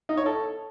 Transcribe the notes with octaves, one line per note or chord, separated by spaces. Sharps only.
D#4
C#5
A4